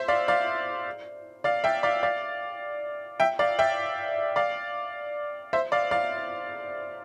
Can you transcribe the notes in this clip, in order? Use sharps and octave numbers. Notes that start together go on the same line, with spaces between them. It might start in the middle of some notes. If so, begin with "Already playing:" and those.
Already playing: C5 E5
D5 F5
D5 F5
D5 F5
E5 G5
D5 F5
D5 F5
E5 G5
D5 F5
E5 G5
D5 F5
C5 E5
D5 F5
D5 F5